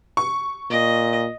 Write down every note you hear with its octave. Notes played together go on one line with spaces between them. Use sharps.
C#6
A#2 D#5